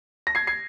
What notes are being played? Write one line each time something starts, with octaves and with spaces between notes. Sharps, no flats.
A#6
G#6 C7
G#6 C7